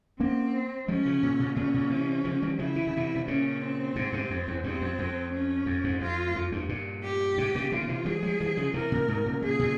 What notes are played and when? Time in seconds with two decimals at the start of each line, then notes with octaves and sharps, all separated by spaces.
0.20 A#3 C4 C#4
0.88 F3 G#3 C#4
1.06 C#3 F3
1.23 A#2 C#3
1.40 A#2 C#3
1.56 A#2 C#3 C#4
1.74 A#2 C#3
1.90 C3 E3
2.25 C#3 F3
2.42 E3 G3
2.59 C#3 F3 E4
2.76 E3
2.87 C#3
2.97 C3 E3
3.16 C3
3.28 A#2 C#3 C#4
3.62 C4
3.96 G#2 C3
4.13 G#2 C3
4.30 F2
4.48 E2
4.64 E2 G2 C4
4.81 F2
4.99 F2
5.33 C#4
5.66 F2
5.84 F2 G#2
6.01 F2 F4
6.35 F2
6.52 E2 G2
6.69 G2 A#2
7.03 G4
7.38 G#2 C3
7.55 A#2 C#3
7.72 A#2 C#3 F4
7.83 C#3
7.89 C3 E3
8.05 E3 G3 G#4
8.22 F3 G#3
8.40 E3 G3
8.57 C#3 F3
8.74 C3 E3 A#4
8.92 A#2 C#3
9.08 G#2 C3
9.26 A#2 C#3
9.42 A#2 C#3 G#4
9.59 A#2 C#3